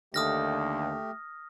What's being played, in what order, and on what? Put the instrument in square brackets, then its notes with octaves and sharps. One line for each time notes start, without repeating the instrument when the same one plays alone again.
[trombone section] D#2 D3 [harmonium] A3 G4 [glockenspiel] D#6 F6 A#6